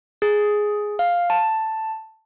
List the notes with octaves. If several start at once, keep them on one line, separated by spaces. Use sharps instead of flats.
G#4
F5
A5